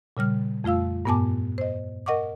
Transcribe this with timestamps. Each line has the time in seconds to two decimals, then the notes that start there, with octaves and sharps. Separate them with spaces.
0.17 A#2 C#3 G3 F6
0.64 F2 A3 F4 F5 E6
1.05 G2 A#2 B3 G#5 A5 D6
1.58 C5 D#5
2.06 A#4 D#5 F#5 C#6 D6